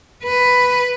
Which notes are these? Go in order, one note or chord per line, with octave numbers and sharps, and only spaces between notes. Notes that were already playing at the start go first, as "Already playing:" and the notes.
B4